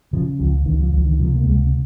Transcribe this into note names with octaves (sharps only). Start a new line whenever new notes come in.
C#3 F3
C#2 F3
C#2 D#3
F3
C#2 F3
D#3
C3 F3
A#3
C#2 G#3